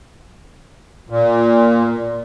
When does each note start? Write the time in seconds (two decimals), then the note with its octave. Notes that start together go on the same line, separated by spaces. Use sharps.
1.10 A#2